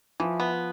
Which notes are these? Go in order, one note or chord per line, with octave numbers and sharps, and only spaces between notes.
E3 F3
B3